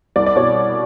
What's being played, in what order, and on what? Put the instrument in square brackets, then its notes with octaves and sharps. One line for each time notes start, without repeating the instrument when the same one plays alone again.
[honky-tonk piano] C2 D5
D5
B2 C#5